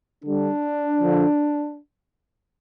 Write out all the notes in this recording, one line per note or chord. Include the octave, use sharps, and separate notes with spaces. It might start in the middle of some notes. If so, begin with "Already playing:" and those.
D3 G3 D4
D3 F3